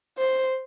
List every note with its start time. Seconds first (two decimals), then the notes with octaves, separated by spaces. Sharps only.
0.18 C5